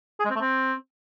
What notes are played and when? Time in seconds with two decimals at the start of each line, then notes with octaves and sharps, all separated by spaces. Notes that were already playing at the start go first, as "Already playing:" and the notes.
0.20 G#4
0.25 G#3
0.30 C4
0.35 A3
0.41 C4